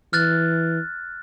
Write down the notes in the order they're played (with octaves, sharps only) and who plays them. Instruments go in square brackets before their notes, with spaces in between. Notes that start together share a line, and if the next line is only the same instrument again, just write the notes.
[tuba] E3 [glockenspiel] F6 F#6 A6